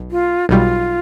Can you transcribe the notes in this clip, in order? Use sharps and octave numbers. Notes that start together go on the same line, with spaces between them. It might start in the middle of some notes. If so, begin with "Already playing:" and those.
Already playing: B1
F4
B1 B2 G3 F4